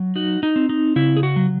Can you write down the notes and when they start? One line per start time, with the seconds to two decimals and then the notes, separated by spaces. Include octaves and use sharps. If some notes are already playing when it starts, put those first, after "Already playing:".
Already playing: F#3
0.16 D#4 F#4
0.43 D#4
0.56 C4
0.69 D#4
0.96 C#3 E4
1.17 G#4
1.23 F#4
1.36 F#3